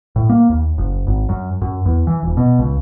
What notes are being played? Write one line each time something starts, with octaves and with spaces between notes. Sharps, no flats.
A2
A#3
D#2
F#1
G#1
F#2
F#2
E2
E3
D#1
B2
C#2